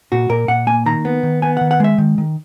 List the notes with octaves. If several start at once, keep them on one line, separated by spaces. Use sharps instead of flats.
A#2 F#4
A#2 A#4
A#2 F#5
A#3 G#5
D#3 A#5
B3
D#3
B3 G#5
D#3 F#5
F#5
G#3 E5
D#3
D#3